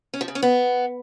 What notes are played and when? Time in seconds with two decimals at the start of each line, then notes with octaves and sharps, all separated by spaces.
0.14 C#4
0.21 F3
0.28 C#3
0.35 C#4
0.42 B3